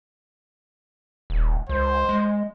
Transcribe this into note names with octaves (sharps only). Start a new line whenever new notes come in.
D#1
C#2 C5
G#3